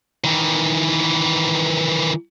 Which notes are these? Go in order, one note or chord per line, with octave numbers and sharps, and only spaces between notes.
D#3 E3